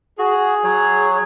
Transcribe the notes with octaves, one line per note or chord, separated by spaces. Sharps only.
F#4 G#4
F#3 C#5